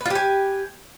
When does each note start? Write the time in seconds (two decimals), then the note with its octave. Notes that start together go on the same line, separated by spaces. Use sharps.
0.01 B4
0.05 F4
0.10 G4
0.15 G#5